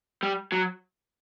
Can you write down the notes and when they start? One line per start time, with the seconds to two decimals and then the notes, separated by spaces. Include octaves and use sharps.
0.23 G3
0.52 F#3